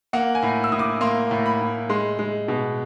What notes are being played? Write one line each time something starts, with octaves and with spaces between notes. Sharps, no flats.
A#3 F#5
G#5
A2
E6
A2 D#6
D6
A#3 C6
A2
B5
A2
G#3 C6
G#3
B2